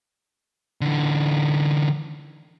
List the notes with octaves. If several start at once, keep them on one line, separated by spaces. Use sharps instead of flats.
D3 E3